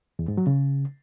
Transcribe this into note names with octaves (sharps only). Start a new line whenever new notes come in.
E2
G#2
F#3
C#3